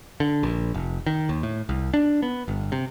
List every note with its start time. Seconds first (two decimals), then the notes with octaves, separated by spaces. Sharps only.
0.20 D3
0.43 A#1
0.74 F1
1.07 D#3
1.29 D#2
1.43 A2
1.69 C2
1.94 D4
2.22 B3
2.48 G1
2.72 C3